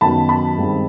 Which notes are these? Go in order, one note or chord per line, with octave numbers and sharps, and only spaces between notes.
F#2 D#3 F#3 B3 A5 B5
A5 B5
G2 D#3 G#3 C4